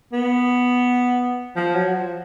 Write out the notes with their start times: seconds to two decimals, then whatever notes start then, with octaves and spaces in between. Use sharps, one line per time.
0.13 B3
1.56 F3
1.74 F#3
1.94 F3